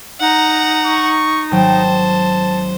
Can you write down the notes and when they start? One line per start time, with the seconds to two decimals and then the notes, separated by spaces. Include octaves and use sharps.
0.20 D#4 F#5 A#5
0.86 C#6
1.51 G#1 F#3 C5 G5 A5